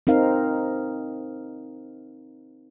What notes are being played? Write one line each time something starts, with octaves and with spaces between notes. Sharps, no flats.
C4 D#4 A#4 F5